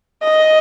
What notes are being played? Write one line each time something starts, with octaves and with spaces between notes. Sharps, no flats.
D#5